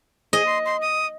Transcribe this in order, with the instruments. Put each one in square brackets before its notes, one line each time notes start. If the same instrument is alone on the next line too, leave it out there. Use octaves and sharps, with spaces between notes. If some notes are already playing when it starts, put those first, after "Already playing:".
[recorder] G#4 [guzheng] D#5
[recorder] C6
C6
D#6